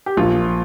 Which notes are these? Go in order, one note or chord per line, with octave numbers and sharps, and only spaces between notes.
G4
A#1 A#2 F4